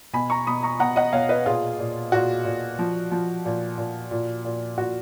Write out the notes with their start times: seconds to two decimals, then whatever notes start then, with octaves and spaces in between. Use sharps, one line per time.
0.13 B2 G#5 B5
0.30 A#5 C#6
0.47 B2 B5 D#6
0.63 A#5 C#6
0.80 B2 F#5 A#5
0.96 D#5 F#5
1.13 B2 C#5 F5
1.29 B4 D#5
1.46 A#2 F4 G#4
1.79 A#2
2.12 A#2 F#4
2.45 A#2
2.79 F3
3.11 F3
3.45 A#2
3.78 A#2
4.11 A#2
4.45 A#2
4.78 A#2 F#4